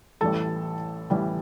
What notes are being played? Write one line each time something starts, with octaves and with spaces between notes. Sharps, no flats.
A1 A2 E3 G3 A4 A5
A1 A2 E3 G3